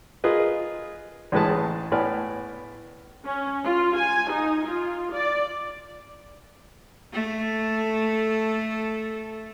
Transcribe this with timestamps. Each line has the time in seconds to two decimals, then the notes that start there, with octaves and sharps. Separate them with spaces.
0.24 F4 G#4 A#4 B4 D#5
1.32 A1 A2 G#3 B4 A5
1.92 A2 B3 D5 G#5 F6
3.25 C#4
3.64 F4
3.97 G#5
4.31 D#4
4.67 F4
5.14 D5
7.13 A3 A4